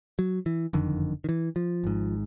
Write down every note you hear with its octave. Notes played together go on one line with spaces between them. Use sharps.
F#3
E3
F#1 F2 D3 D#3
D#3
E3
F3
G#1 G#2